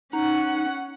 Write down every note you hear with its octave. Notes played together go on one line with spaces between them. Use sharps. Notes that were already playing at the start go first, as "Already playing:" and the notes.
C#4 D#4 F#5